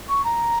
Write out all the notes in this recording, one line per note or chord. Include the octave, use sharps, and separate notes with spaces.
C#6
A#5